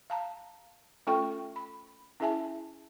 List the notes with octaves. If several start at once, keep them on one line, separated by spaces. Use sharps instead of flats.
F5 A5 A#5
A3 C#4 F4 A4 G5 C#6
B5
C#4 E4 G#4 E5 G#5 A5